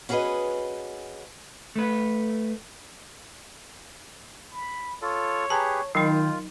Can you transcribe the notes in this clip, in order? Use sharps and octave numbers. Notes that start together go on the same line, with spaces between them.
C#4 F#4 G#4 A#4 B4 D#5
A3 B4
B5
F4 A4 C#5
G4 G#4 B4 A5 A#5
D#3 F#3 D#4 F4 G5